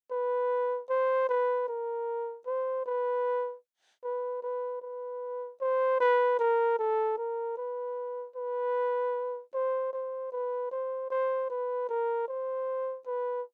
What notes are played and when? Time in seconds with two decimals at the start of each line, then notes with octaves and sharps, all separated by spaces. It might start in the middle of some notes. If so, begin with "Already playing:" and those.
0.11 B4
0.90 C5
1.29 B4
1.68 A#4
2.47 C5
2.86 B4
4.04 B4
4.43 B4
4.82 B4
5.61 C5
6.00 B4
6.39 A#4
6.79 A4
7.18 A#4
7.57 B4
8.36 B4
9.54 C5
9.93 C5
10.32 B4
10.71 C5
11.10 C5
11.50 B4
11.89 A#4
12.28 C5
13.07 B4